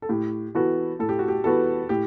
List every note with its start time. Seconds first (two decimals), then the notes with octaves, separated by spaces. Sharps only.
0.02 A4
0.09 A2 G4
0.55 E3 B3 F#4 A4
0.99 A2 A4
1.09 G4
1.19 F#4
1.28 G4
1.44 E3 B3 F#4 A4
1.89 A2 G4